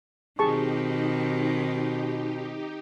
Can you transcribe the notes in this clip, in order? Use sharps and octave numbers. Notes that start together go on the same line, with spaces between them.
B2 D#3 C4 D#4 G4 G#4 A5 C#6